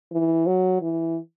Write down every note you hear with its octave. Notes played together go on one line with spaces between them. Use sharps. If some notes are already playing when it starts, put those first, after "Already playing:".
E3
F#3
E3